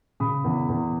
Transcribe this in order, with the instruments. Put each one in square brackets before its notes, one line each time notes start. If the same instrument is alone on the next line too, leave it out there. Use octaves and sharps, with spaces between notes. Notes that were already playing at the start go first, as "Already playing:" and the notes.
[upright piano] C#3 B5 D#6
E2
E2